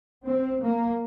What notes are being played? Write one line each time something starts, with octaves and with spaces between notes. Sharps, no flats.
C4
A#3